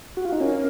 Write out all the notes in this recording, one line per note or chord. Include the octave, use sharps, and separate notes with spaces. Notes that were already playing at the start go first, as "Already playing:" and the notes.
F#4
F4
D#4
C#4 A#4